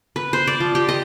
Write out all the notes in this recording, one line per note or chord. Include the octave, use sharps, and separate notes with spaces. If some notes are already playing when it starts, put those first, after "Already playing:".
B4
C5
D5
F3
G4
D#5